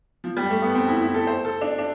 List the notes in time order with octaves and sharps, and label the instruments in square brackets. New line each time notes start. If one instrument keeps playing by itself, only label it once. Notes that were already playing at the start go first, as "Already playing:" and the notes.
[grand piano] F3
G3
A3
B3
C4
E4
E4
A4
C5
A4
D4
D4